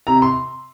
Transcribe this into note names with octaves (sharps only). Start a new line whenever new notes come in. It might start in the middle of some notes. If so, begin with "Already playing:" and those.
C3 A#5
C6